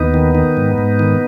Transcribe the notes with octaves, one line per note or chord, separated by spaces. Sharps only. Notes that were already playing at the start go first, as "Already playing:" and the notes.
Already playing: D#2 B3 D#4
D#3
D#3
G#2
G#2
D#3